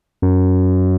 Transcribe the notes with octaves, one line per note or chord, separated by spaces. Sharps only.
F#2